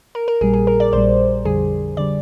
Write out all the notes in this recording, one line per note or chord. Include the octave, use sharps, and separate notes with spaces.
A#4
A#4
A#1 A#2 G3 G#4
G#4
A#4
D5
A#1 A#2 G3 C5
F2 D3 G3 G#4
D3 G3 D5